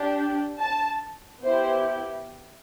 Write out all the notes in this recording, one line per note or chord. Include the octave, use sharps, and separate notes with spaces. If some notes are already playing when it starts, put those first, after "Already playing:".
Already playing: D4 G4
A5
B3 E4 G4 C5